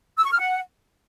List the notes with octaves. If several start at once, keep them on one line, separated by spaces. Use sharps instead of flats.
E6
C#6
F6
F#5